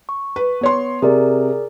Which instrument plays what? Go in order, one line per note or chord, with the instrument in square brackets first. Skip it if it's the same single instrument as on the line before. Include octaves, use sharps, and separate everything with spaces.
[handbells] C#6
[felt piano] B4
B3 C#5 C6
[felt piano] C3 [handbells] G#4 A#4 D5